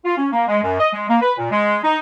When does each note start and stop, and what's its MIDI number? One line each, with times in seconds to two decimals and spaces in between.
0.04 0.15 65
0.18 0.28 61
0.32 0.47 58
0.48 0.59 56
0.63 0.76 42
0.80 0.89 75
0.93 1.09 56
1.09 1.17 58
1.21 1.32 71
1.38 1.48 46
1.51 1.78 56
1.84 1.97 63